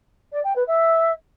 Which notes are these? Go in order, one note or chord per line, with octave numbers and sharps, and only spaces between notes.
D5
G5
B4
E5